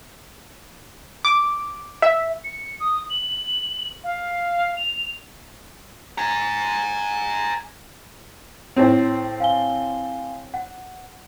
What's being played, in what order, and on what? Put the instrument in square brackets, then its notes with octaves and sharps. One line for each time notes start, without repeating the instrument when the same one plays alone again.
[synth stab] D6
E5
[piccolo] C#7
D#6
F#7
F5
F7
[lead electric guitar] G#5 A#5
[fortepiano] A2 C4
[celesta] F5 G#5 G7
F#5